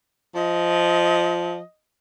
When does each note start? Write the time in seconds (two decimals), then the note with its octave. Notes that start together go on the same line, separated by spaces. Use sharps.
0.35 F3 D#5